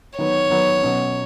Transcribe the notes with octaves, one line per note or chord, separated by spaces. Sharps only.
D#3 F#3 B3 C#5
D#3 F#3 B3
B2 F#3 C#4